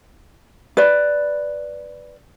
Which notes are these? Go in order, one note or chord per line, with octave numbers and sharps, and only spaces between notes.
B4 D5